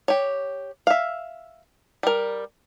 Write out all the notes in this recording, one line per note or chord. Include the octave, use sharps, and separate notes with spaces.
G4 C#5
E5 F5
G3 A#4